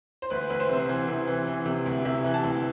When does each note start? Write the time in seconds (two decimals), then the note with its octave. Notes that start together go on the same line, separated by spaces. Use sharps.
0.22 C5
0.30 D2 B4
0.50 D2 B4
0.60 C5
0.69 C3
0.89 E3
1.08 C3
1.27 E3
1.47 E3
1.66 C3
1.86 D2
2.05 C3 E5
2.24 E3
2.34 A5
2.44 D2